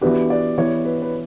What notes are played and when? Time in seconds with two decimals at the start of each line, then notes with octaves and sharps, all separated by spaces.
0.01 E3 B3 D4 F#4 G4 B4
0.30 D5
0.58 E3 B3 E4 C#5
0.85 B4
1.02 B4